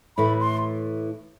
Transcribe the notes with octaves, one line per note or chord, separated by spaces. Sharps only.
A2 E3 A3 E4 B5
C6